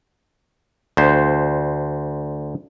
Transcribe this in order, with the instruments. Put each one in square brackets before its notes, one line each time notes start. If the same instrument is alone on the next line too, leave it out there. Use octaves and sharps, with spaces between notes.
[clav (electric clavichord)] D2 C5